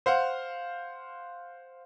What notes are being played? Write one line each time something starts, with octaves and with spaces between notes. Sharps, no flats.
C5 F5 F#5